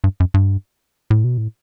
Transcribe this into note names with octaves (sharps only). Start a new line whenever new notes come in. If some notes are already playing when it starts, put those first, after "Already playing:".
G2
F#2
G2
A2
B2
A2